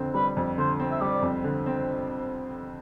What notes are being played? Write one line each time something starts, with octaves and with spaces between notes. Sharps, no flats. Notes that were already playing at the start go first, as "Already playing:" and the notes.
Already playing: F2 D3 C4
G3 B4
F2
D3 C5
C4
E5
G3 D5
F2
D3
C4